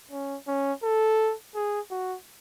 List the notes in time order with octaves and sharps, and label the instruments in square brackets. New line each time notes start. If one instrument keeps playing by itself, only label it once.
[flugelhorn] C#4
C#4
A4
G#4
F#4